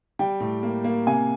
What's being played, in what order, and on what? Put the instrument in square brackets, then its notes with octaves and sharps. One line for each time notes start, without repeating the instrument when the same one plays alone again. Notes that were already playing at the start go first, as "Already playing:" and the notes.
[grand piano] G3 G5
A2
A#3
A#3
C3 G#5